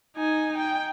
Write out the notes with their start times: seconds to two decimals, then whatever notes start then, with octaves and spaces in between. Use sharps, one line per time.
0.16 D#4 G#5
0.58 G5